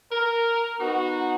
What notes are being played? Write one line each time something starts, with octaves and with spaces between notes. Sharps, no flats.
A#4
B3 D#4 F#4